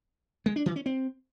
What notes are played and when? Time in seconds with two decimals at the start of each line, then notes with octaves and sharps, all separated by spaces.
0.46 G#3
0.56 D4
0.66 E3
0.76 C#4
0.86 C4